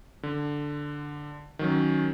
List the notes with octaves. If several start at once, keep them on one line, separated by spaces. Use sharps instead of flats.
D3
D#3 F#3 C#4